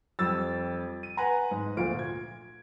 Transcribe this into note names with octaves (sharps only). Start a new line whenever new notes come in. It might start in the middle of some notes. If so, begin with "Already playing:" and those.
F2 G3 E6 A6
D#7
B4 F#5 G#5 A#5
G#2
D2 A#2 F3 D7
G#6